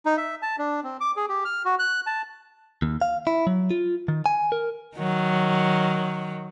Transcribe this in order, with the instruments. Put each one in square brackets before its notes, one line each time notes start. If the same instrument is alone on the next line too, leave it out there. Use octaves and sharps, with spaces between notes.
[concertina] D#4
E5
A5
D4
C4
D6
G#4
G4
F6
F#4
F#6
A5
[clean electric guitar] D#2
F5
E4
F#3
F4
D#3
G#5
A#4
[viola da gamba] D#3 F#3